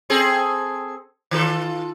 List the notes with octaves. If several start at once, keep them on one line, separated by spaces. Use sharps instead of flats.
C4 G#4 A4
D#3 F4 A4